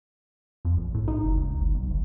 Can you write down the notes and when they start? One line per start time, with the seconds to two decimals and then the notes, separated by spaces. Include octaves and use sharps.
0.65 F2
0.77 A#1
0.94 A2
1.08 D#4
1.23 F#1
1.37 C#2
1.60 G1
1.74 B1
1.90 G1